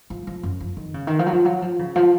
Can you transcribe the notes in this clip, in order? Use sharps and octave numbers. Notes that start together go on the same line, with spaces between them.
F3
F3
F#2
F3
D#3
C#3
D#3
F3
F#3
F3
F#3
F3
C#3
F3